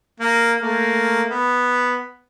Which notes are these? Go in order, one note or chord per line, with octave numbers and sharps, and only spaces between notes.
A#3
A3 A#3
B3